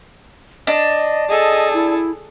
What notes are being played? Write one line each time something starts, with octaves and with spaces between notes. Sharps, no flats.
D4 D#5
G#4 A4 D#5
E4